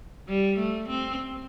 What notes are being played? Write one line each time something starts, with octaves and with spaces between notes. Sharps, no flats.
G3
A3
C4